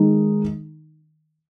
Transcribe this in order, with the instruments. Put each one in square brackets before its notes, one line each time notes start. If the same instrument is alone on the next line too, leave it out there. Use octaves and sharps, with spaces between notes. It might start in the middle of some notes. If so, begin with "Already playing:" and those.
Already playing: [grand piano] D#3 G#3 D#4